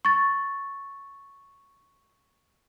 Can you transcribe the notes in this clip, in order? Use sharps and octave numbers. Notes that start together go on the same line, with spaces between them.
C#6 A6